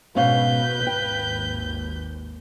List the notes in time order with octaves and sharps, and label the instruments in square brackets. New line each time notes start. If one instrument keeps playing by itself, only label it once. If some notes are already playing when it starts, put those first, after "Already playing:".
[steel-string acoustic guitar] G#2 C#4 F5 [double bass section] B2 [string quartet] B4 G6
[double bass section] G#1 D#2 [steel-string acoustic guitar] G5